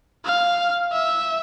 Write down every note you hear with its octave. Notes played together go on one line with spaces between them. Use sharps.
F5
E5